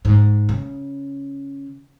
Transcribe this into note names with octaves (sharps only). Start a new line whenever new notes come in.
G#2
C#3